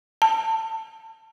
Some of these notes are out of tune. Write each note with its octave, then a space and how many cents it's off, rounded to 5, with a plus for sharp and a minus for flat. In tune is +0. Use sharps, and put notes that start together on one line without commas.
A5 +25